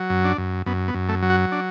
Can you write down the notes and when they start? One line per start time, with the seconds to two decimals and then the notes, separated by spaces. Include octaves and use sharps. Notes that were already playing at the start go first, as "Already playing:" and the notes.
Already playing: F#3
0.10 F#2
0.24 D4
0.38 F#2
0.66 F#2 B3
0.88 B3
0.94 F#2
1.09 A3
1.22 F#3
1.30 F#4
1.52 D4